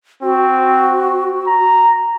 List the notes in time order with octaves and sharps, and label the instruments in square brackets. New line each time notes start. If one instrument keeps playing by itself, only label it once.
[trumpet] C4 [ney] F#4
[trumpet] A#5